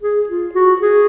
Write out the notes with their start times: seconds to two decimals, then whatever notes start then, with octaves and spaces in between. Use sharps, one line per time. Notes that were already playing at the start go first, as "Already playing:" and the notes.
0.02 G#4
0.29 F4
0.55 F#4
0.82 G#4